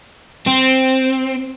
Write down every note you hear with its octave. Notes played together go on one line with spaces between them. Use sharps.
C4